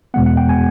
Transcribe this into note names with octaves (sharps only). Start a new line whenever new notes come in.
E2 B2 G#3 B3 F#5
F#5
G5
G#5